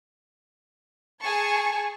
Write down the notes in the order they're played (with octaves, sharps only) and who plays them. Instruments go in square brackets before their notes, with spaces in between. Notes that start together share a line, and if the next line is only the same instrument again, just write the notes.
[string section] G#4 G#5 A5 C#6